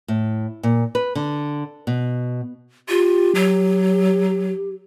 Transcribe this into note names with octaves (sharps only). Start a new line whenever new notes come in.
A2
A#2
B4
D3
B2
F4 G4
F#3